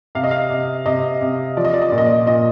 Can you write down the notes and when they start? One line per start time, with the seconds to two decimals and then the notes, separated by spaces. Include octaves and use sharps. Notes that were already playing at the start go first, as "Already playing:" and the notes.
0.15 C3 F5
0.24 D#5
0.31 F5
0.50 C3
0.86 C3 D#5
1.21 C3
1.57 F3 D5
1.65 D#5
1.74 D5
1.82 D#5
1.90 A#2 D5
1.98 D#5
2.06 D5
2.27 A#2 D#5